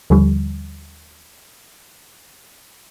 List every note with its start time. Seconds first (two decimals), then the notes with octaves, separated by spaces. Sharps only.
0.10 D#2 D3 F3 G3